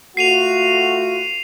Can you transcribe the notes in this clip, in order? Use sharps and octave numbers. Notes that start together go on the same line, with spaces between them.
A3 F4 F#4 C7 D#7 F7